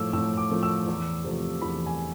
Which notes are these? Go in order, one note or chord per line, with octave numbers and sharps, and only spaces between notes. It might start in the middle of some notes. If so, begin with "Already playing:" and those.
Already playing: A2 F3 A3 D6 E6
A2 E6
D6
F3 A3
E6
E2
C3 F3 A3
E2 B5
G#5